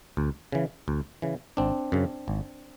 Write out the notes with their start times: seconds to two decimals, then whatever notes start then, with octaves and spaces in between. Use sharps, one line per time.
0.17 D2
0.52 C#3 E3
0.88 D2
1.22 C#3 E3
1.57 G#1 C4 D4
1.92 F#2 C#3
2.28 G#1